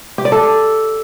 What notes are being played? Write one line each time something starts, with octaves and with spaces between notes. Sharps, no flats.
G4
D5
A4